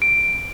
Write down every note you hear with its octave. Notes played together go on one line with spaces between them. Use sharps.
D7